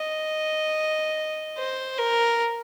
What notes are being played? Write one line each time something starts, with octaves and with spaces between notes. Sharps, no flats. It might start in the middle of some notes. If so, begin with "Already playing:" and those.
Already playing: D#5
C5
A#4